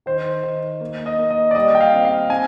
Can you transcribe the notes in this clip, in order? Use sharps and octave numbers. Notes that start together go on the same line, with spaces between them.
D#3 C5
D#3
A#3
D#5
A#3
D#5
D5
G3 D#5
G5
F5
C4
F5
C4 G#5